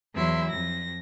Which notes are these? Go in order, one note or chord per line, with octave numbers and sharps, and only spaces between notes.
E2 F#3 E4 E5 C6
F2 A#6